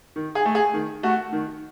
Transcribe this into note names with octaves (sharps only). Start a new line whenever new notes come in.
D#3
G#4
A3
G#4
D#3
A3 F#4
D#3